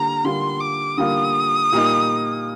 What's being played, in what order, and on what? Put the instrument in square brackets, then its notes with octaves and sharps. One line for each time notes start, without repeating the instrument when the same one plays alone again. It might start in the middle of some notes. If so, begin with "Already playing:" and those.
Already playing: [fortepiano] D3 G3 A#3 [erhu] A#5
[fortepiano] D3 G3 A#3 F4 [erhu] C6
[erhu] D6
[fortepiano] D3 G3 A#3 F4 [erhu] D#6
[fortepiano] A#2 G3 A#3 D#4